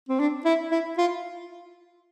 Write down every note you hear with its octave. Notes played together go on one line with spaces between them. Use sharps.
C4
D4
E4
E4
F4